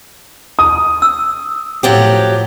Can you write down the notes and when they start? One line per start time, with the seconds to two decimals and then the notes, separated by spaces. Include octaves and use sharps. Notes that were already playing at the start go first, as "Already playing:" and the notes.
0.59 D#6
1.02 E6
1.83 A2 F3 F#3 G4